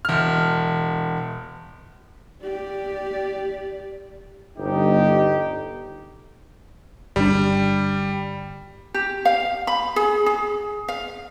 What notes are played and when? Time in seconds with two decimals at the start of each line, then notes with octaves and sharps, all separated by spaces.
0.05 E1 F6
2.42 G4 D5
4.58 G1 D#4 G4
7.16 G1 G3 D4
8.94 G4
9.25 F5
9.67 B5
9.96 G#4
10.26 G#4
10.88 F5